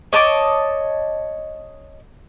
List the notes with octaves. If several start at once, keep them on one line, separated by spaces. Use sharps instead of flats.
C#5 D#5 A5 D6